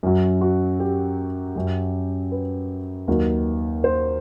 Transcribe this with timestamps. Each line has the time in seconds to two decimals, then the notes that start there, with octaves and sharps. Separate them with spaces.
0.03 F#2 F#3
0.41 F#4
0.80 G4
1.56 F#2 F#3
2.32 B4
3.08 D#2 D#3 F#3
3.84 C5